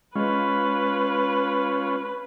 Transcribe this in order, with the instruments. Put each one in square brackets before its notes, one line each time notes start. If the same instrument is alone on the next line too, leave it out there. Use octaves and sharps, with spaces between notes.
[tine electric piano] G#3 [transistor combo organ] C#4 F4 [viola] B4